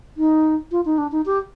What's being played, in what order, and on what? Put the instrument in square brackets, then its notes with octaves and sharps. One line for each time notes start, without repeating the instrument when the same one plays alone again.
[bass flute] D#4
F4
D#4
D4
D#4
G4